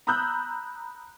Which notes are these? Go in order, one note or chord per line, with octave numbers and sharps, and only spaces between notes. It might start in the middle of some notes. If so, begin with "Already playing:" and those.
A#5 B5 D#6 E6 F#6 G6